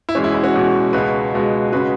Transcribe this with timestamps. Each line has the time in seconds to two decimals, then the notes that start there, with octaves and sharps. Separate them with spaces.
0.09 E4
0.15 E2 B2 G#3 C#4
0.24 E4
0.35 E4
0.44 C#4 F#4
0.54 E2 B2 G#3
0.93 C#2 B2 G#3 F#4 B4
1.34 C#2 B2 G#3
1.72 C#3 G#3 F#4 B4